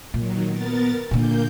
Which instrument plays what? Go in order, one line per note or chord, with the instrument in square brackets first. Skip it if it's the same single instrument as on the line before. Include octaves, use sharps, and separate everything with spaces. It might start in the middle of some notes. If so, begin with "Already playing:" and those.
[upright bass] A#2 [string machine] D#3 F#3
[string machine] B3 A#4 A6
[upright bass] A#2 D3 [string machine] A#3 G6